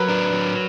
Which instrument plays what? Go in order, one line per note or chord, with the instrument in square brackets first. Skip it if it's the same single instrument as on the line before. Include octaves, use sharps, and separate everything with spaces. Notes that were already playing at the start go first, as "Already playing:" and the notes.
Already playing: [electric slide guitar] F#3 [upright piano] A#4 B4
[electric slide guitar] D4
F#3